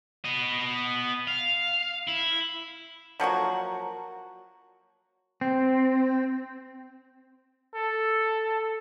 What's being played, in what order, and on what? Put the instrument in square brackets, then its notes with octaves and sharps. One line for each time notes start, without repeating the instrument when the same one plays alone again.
[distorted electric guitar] B3 D#5
F5
E4
[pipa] F3 F#3 A#3 F#4
[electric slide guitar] C4
[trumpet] A4